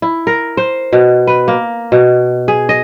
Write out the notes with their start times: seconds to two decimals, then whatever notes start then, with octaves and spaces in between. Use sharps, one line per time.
0.02 E4
0.27 A#4
0.57 C5
0.93 B2
1.27 B4
1.48 A#3
1.92 B2
2.48 G#4
2.69 D#5